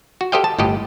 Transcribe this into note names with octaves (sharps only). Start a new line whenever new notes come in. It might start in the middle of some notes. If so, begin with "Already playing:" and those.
F#4
G4 A4 C5 D#5 F5 G5
A5
G1 A2 G4 D#5